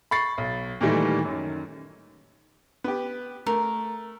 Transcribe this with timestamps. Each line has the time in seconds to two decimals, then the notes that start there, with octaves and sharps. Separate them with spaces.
0.11 B5 C#6 A6 C7
0.38 B1
0.81 A#2 D#3 E3 G3 A3
1.25 F#2 D#3
2.84 B3 G4
3.46 A3 A#4